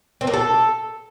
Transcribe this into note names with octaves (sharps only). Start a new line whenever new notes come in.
C4
A#3
A4